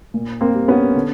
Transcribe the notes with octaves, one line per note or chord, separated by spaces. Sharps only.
A#2
A#3 C4
G3
B3 C#4
D3